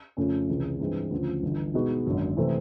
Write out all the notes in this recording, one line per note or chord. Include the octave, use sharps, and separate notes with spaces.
F2 C#3 F3 A3 C#4
C#2 C3 E3 G#3 C#4
G2 E3 G#3 C4
D2 C#3 F3
G1 G2 E3
B2 G#3 B3 D#4 F#4
G#1 F#2 D3
C3 E3 A3 C4